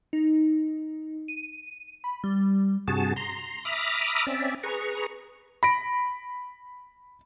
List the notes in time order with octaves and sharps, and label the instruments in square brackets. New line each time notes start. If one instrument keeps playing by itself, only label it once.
[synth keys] D#4
D#7
B5
G3
[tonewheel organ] G2 C3 F#4 G#4 A5
A#5 C6
E5 A#5 B5 D6 D#6 F6
C4 C#4 D5 E5
G#4 B4 A#5 C#6
[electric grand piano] B5 A#6 D7